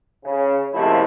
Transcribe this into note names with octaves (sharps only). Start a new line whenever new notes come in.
C#3
C#2 C3 F3 A3 A#3 E4